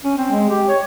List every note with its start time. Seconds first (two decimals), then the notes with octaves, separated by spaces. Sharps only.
0.05 C#4
0.17 C4
0.31 G#3
0.50 G4
0.68 C#5